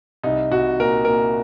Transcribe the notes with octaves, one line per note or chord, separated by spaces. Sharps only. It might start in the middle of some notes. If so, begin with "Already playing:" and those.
C2 D#4
C2 F#4
A#2 A#4
A#2 A#4